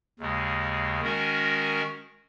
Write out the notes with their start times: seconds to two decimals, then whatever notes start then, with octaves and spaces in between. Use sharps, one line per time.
0.19 D#2 C#3 G#3
1.01 D#3 G#3 C#4 F#4 A#4